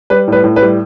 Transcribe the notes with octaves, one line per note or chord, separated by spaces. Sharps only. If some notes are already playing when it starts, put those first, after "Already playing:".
G3 B4
A2 B4
A2
B4
G3